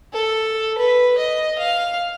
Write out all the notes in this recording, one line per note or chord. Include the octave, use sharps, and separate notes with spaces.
A4
B4
D#5
F5